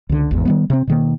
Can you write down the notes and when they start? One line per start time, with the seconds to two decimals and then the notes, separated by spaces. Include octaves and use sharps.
0.09 C#2 D3
0.31 G#1 E2
0.45 D#3 G3 B3
0.70 C3 C4
0.87 B2 D#3 A#3